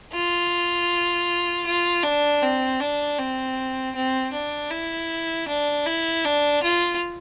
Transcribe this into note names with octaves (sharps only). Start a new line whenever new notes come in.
F4
F4
D4
C4
D4
C4
C4
D4
E4
D4
E4
D4
F4